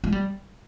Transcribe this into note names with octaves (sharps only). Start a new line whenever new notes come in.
G#3
G3